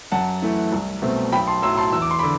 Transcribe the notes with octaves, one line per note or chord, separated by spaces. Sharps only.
F#2 F#5 A5
E3 A3
C2
B2 A3 C4
B1 G5 B5
A5 C6
A2 F#3 C6 E6
A5 C6
E2 E6
D6
C6
D3 B5 D6